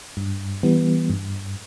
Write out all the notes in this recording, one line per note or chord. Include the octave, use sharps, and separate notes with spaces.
G2
E3 G3 B3
G2